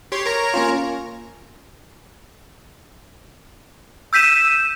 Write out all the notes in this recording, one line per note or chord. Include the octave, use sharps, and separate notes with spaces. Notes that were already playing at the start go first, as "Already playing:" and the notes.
G4 C#5 C6
A#4 C#5 A#5
A#3 C#4 F4
E6 G6 B6 D#7 E7